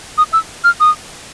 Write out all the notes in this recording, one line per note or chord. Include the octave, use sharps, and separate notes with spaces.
D#6
E6
F6
D#6